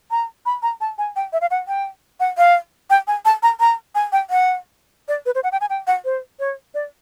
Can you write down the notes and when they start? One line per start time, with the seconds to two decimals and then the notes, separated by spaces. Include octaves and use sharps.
0.11 A#5
0.46 B5
0.63 A#5
0.81 A5
0.98 G#5
1.16 G5
1.33 E5
1.41 F5
1.51 F#5
1.68 G5
2.20 F#5
2.38 F5
2.90 G5
3.07 G#5
3.25 A5
3.43 A#5
3.60 A#5
3.95 G#5
4.12 G5
4.30 F#5
5.08 D5
5.26 B4
5.35 C5
5.44 F#5
5.52 G5
5.61 G#5
5.70 G5
5.87 F#5
6.05 C5
6.39 C#5
6.74 D5